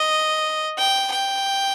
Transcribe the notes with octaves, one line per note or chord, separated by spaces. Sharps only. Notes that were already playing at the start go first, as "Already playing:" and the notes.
Already playing: D#5
G5
G5